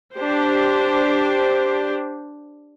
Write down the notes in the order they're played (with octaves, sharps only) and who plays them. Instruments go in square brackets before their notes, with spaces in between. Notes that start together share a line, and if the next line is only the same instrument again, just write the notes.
[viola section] D4 G4 C5